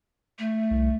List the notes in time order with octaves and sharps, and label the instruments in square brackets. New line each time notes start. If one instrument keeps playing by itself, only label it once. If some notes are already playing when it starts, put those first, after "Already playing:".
[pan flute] A3
[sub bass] C2